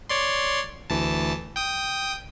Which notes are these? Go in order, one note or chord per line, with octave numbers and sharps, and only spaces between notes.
C#5 D5 C6
D2 E3 A5
G5 D#6